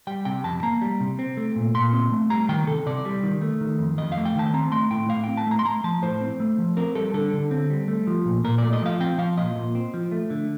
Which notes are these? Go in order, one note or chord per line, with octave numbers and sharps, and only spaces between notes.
G3 G5
C3 G5
F2 A5
A#3 A#5
G3
C3
C4
A3
A#2
A#2 C6
C4
A3
G3 A#5
D#3 G5
C3 A4
C3 D5
G3
D#3
A3
D#3
F2
F2 D#5
F5
A3
G5
D#3 A5
C4 A#5
A3 C6
A2 G5
A2 F5
C4 G5
A5
A3 A#5
C6
A3 A#5
F3 A5
A2 C5
C4
A3
F3
C4 A#4
G3 A4
D3 A4
D3
C4
G3
A3
F3
A#2
A#2 A#4
A3 D5
D#5
F3 F5
C4 G5
F3 F5
A#2 D#5
A#2
C4
F3
A3
D3